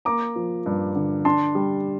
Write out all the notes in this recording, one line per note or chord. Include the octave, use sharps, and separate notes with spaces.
A#3 A#5 D6
F3
G2
D3
D4 A5 C6
G3